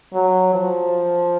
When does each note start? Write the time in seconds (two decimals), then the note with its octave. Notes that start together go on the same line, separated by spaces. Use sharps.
0.14 F#3
0.54 F3